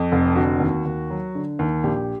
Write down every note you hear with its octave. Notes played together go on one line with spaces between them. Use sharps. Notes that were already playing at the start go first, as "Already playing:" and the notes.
Already playing: F2
F1
D3 F#4
D#2
D#2
F#3
D3
D#2
A#1 G4